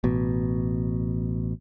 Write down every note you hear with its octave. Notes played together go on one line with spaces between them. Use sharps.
A1 B2